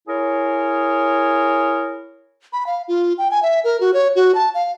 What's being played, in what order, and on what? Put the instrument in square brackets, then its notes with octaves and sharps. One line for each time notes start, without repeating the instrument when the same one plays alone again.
[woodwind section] E4 G#4 A#4 C#5
[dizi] B5
F5
F4
G5
G#5
E5
A#4
F#4
C#5
F#4
A5
F5